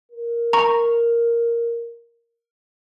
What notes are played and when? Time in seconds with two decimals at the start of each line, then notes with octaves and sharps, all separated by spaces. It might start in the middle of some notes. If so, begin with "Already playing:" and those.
0.12 A#4
0.53 A#5 C#6